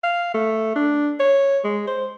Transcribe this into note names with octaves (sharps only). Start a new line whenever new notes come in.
F5
A3
D4
C#5
G#3
C5